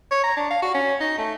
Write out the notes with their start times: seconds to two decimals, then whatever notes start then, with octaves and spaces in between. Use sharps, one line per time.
0.11 C#5
0.24 A#5
0.37 D4
0.50 F5
0.62 F#4
0.74 C#4
1.00 D#4
1.18 A3